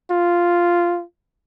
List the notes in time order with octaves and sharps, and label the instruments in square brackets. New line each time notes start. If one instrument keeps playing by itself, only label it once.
[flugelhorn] F4